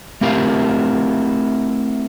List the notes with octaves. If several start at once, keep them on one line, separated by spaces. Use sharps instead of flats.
A3 C4 E4 G4 A#4 F5